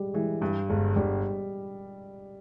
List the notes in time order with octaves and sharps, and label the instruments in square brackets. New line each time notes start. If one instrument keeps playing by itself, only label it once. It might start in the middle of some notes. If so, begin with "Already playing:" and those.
Already playing: [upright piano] G3 G#3
[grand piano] E3 [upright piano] G#3
[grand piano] G2 [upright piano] G3
[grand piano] G1 [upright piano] G#3
[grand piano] G1 [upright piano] G3